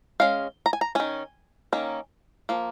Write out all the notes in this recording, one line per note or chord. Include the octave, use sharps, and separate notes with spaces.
G#3 C#4 F5
A#5
G#5
A#5
D#3 C#4 G#5
D#3 A#3 C#4
F3 A#3